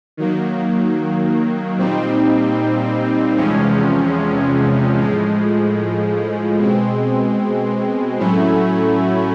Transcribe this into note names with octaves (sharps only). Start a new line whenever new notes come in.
D#3 F#3 A#3
A#2 G3 C4 D#4
E2 C3 F3 G#3 C#4
A2 F3 G#3
B2 G#3 C4
A2 F#3 A3 C#4 E4